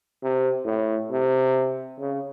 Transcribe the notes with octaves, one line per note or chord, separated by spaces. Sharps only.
C3
A2
C3
C#3